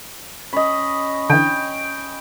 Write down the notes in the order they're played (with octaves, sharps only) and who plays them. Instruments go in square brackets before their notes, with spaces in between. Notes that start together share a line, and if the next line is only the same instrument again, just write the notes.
[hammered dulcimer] C#4 D#5 [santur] B5
[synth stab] D3 E3 [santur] G5